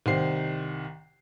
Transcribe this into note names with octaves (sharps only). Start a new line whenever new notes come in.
C2 D#3 C5 C7